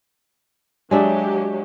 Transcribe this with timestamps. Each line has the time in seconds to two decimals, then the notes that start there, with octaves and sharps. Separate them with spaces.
0.91 F#3 G#3 D4 G4 E5